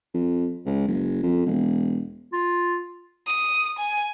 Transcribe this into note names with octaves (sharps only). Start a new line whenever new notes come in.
F2
C#2
F#1
F2
E1
F4
D#6
G#5